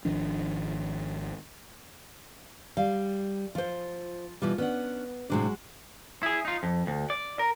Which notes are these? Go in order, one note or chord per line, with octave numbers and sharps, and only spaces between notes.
G#1 D#3 F3 D4
G3 F5
F3 F4 C5
B2 E3 G3 F4
B3 C#4 D4 F#5
A2 C3 F#3 G#3 D4 F#4
E4 G#4
D#4 F4
F2
D2
D5
A#4